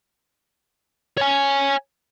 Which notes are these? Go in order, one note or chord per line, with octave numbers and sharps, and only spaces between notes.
C#5 G#5